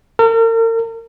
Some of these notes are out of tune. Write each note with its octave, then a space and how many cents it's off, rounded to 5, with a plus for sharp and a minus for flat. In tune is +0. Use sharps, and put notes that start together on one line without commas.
A#4 -40